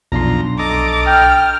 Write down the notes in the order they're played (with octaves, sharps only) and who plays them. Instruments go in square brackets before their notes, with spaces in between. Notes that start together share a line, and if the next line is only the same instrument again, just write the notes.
[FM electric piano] B1 D4 C6 [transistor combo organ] F2 A#5
[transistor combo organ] A4 D#5 A#5 [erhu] D6
[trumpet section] G5 [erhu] F6